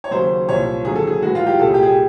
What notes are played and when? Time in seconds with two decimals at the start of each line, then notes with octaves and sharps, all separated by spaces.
0.04 C#5
0.11 D#2 C#3 F#3 C5
0.49 C2 A#2 F3 C#5
0.85 D#2 D3 F#3 G#4
0.96 A4
1.07 G#4
1.22 A2 E3 G#3 F#4
1.35 F4
1.46 G4
1.59 C2 A#2 G3 A4
1.67 G#4
1.74 G4
1.83 G#4